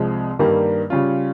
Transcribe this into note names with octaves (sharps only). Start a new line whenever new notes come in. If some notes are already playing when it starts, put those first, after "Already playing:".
Already playing: C2 C3 F3 G#3
G2 D#3 G3 A#3
C#3 G3 C#4 F4